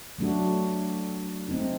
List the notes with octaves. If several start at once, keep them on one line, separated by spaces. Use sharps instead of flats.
F#3 A3 D4 F#4
A3 C4 D#4